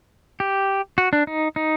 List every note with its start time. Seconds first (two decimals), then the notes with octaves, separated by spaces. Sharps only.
0.40 G4
0.98 F#4
1.13 D4
1.27 D#4
1.56 D#4